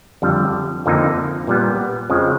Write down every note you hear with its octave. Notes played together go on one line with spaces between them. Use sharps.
F2 D3 G3
F2 D3 F3 A#3 D#4
A#2 G3 B3
F2 C#3 F3 G#3